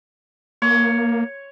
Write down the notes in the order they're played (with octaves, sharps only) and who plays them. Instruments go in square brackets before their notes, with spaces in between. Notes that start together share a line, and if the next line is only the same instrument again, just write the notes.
[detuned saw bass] A#3 [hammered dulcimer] C#5